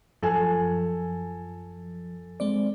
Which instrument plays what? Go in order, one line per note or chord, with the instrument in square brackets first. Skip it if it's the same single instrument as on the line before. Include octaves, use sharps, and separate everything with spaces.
[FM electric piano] F#2 F3 [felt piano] A4 G#5
[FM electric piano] G#3 C4 D5